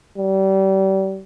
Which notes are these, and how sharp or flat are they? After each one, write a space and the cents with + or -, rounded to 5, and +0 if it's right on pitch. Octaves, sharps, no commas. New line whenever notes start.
G3 -30